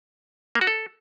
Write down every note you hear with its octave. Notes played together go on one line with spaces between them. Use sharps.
A#3
F#4
A4